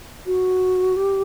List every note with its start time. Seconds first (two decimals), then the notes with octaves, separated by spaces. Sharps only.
0.26 F#4
0.96 G4